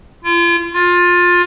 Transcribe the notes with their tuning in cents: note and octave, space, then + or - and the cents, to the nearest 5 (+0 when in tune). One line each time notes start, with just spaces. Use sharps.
F4 -35
F4 +20